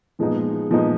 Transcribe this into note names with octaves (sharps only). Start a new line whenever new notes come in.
A#2 F3 G#3 B3 D#4
A#2 F3 G#3 B3 D#4